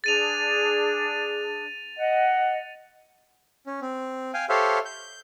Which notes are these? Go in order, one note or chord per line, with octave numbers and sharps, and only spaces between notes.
D4 G#4 A6 D#7 F7
D#5 F#5
C#4
C4
F5 G5 G#5
G4 A4 C5 C#5 E5 F5
G6